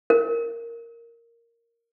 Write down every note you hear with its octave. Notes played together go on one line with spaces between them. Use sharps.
A#4